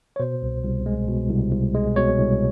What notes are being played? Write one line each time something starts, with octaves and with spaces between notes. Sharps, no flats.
C#5
B2 C5
C2
C2
G#3
B2
C2
C2
G#3
B2 C#5
C2